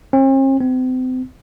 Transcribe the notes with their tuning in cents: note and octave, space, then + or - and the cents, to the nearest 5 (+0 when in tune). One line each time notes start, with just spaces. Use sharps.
C4 +45
C4 -40